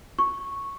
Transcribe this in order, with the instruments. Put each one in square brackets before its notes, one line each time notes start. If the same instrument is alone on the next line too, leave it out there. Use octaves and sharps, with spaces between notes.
[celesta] C#6